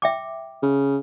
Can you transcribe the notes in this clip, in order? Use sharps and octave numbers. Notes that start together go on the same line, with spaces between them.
E5 G5 D6
C#3